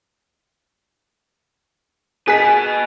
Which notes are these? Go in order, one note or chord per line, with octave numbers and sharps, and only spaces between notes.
G#4 B4 D#5 B6